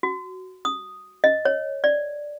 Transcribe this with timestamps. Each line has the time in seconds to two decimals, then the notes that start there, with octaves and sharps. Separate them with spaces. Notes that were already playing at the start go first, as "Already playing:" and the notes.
0.03 F#4
0.65 D#6
1.24 D#5
1.45 C#5
1.84 D5